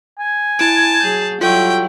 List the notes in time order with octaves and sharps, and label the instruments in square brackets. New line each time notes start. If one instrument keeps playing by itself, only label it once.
[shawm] G#5
[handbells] E4 D7 [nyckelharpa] A5
[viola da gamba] F#3 G#4 [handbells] G6
[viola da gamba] F#3 G3 E4 [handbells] F4 A4 C#6 [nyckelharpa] G5